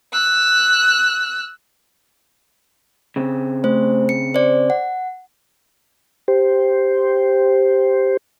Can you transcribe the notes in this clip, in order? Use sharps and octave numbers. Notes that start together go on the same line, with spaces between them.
E6 F#6
C#3 C4
A3 C5
C#7
C5 D5
F#5
G4 C5